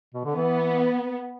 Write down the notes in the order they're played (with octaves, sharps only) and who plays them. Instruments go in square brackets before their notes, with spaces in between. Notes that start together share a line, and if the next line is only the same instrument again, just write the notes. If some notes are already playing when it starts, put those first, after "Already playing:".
[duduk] B2
D3
[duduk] E3 [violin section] B3